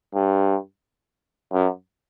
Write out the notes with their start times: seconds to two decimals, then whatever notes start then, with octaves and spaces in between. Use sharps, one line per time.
0.14 G2
1.53 F#2